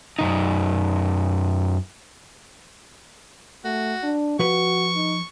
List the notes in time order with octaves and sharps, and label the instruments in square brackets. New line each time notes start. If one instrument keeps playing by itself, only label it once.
[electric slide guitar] F#2 C#3 D#4
[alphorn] A3 [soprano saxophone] F#4
[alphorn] D4
[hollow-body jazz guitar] F3 B4 B5 [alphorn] F#4 [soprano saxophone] C#6
[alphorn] D#4